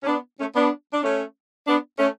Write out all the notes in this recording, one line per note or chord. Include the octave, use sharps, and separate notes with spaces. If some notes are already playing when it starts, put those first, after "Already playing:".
C#4
B3 D4
A3 C#4
B3 D4
D4
A3 C#4
B3 D4
A3 C#4